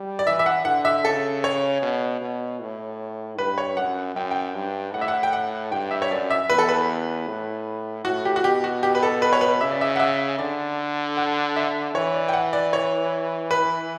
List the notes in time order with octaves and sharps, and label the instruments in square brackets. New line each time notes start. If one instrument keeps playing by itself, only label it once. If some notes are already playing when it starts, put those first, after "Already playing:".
Already playing: [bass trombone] G3
[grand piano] D5
[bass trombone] E3 [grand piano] E5
[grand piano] E5
F#5
[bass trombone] D3 [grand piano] F#5
[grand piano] E5
[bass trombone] C#3 [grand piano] A4
[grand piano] C#5
[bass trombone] B2
B2
A2
[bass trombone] G2 [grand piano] B4
[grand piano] C#5
[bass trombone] F#2 [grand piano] F#5
[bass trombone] F#2 [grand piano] G5
[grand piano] G5
[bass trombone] G2
[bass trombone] A2 [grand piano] F#5
[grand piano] E5
F#5
G5
F#5
[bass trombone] G2 [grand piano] G5
[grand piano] E5
C#5
[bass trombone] F#2 [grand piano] D5
[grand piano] E5
[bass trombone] E2 [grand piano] B4
[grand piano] A4
B4
[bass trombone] A2
[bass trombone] A2 [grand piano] F#4
[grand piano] G4
F#4
[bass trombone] B2 [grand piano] G4
[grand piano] F#4
G4
B4
A4
B4
C#5
B4
[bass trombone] C#3 [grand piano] E5
[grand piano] D5
E5
F#5
E5
[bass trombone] D3 [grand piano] D5
[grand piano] F#5
E5
[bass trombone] E3 [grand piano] C#5
[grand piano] D5
G5
F#5
D5
C#5
B4